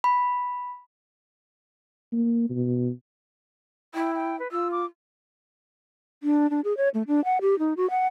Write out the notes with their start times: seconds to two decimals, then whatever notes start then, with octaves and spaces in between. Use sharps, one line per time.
0.04 B5
2.12 A#3
2.50 B2
3.95 E4 G5
4.15 G5
4.39 B4
4.52 F4 E6
4.72 D6
6.23 D4
6.50 D4
6.64 G#4
6.77 C#5
6.94 A3
7.08 D4
7.24 F#5
7.41 G4
7.59 D#4
7.77 F#4
7.90 F#5